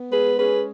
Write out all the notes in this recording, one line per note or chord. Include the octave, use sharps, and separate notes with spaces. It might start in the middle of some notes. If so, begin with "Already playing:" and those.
Already playing: B3
G#3 G#4 B4
C#4 G#4 B4